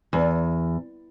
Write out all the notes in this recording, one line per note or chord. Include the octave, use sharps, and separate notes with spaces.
E2